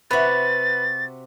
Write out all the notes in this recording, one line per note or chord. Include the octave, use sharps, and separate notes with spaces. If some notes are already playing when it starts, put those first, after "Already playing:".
C3 F#4 B4 A6